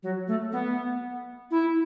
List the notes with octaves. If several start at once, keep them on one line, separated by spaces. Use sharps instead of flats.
F#3
A3
B3
E4